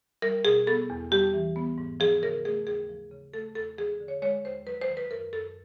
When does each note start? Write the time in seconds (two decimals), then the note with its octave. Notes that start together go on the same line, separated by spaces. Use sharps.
0.22 G3 A#4
0.45 B2 G#4
0.67 B3 A4
0.90 E2
1.12 G3 G4
1.34 E3
1.56 B3
1.78 G#2
2.00 F3 G#4
2.22 C#3 A#4
2.45 A3 G#4
2.67 D#2 G#4
2.89 F3
3.12 C#3
3.34 A3 A4
3.55 E2 A4
3.78 F3 G#4
4.00 D3
4.08 C#5
4.22 G#3 C#5
4.45 D#2 C5
4.66 F#3 B4
4.81 C5
4.90 D#3
4.97 B4
5.11 F#2 A#4
5.33 F#2 A4